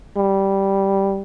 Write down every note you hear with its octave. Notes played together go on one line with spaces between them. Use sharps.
G3